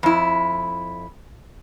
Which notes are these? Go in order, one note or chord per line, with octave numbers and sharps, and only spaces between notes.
F2 E4